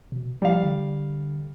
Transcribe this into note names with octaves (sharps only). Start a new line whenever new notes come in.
B2
F3 G3 F5
D3